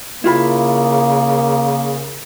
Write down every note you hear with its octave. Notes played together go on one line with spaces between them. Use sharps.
C#3 A#3 E4 F4 B5